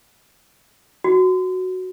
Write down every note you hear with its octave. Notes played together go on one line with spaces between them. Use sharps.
F#4